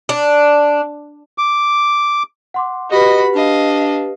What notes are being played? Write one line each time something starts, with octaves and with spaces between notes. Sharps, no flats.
D4
D6
F#5 C6 D6
F#4 G4 B4 D#5 B5
D4 D#5 F5